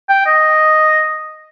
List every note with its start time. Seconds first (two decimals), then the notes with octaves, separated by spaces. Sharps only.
0.09 G5
0.26 D#5